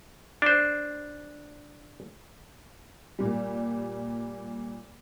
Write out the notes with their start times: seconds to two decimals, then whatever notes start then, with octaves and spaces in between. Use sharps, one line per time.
0.42 D4 C5
3.19 A#2 G3